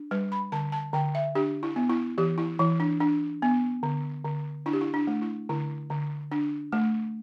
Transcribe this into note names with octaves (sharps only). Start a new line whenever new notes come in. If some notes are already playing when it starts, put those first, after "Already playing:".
Already playing: D4
G3 B4
B5
D3 A5
A5
D3 G5
E5
D4 G4
E4
B3
E4
E3 G4
E4
E3 E4
D4
D4
B3
D3
D3
D4 E4
G4
E4
D4
A3
E4
D3 E4
D3
D4
A3